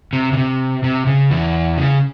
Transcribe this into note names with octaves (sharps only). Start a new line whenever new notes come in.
C3
C#3
C3
C3
C#3
E2 E3
C#3